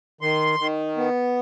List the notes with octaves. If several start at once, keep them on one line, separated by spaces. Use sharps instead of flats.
D#3 C6
D#3
B3